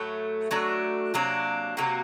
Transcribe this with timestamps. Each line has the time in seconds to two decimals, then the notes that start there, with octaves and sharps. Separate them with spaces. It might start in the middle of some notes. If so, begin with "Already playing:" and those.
Already playing: A2 F#3 A3
0.51 F#3 A3 D4 F#4
1.14 C3 F#3 A#3 D4
1.77 C3 F#3 A#3 F#4